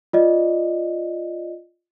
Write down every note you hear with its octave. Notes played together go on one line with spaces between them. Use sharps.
F4 D5 D#5